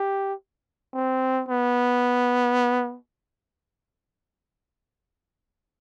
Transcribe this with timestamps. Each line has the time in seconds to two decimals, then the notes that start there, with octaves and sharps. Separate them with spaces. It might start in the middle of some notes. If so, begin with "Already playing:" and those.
Already playing: G4
0.94 C4
1.48 B3